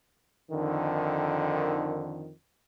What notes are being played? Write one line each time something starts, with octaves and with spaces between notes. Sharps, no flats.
F2 D3 D#3